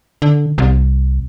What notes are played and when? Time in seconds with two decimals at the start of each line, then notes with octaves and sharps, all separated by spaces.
0.22 D3
0.58 C2